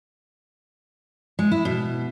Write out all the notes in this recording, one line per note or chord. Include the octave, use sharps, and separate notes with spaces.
G#3
E4
B2